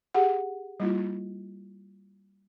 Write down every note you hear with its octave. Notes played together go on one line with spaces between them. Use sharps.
G4 G#4 F#5
G3 A#3 E4 F4